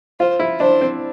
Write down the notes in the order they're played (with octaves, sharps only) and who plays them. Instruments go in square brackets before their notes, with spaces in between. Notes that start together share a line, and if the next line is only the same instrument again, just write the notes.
[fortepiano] F4 [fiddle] C5
[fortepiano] E4
[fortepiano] D4 [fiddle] C5
[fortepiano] C4